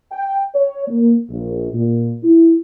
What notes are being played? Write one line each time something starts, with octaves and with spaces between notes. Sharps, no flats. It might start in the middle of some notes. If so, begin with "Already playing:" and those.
G5
C#5
A#3
A#1
A#2
E4